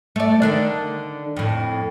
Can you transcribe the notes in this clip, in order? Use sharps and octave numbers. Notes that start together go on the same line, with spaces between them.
A3 D5
D3 D#3 D4
F2 A2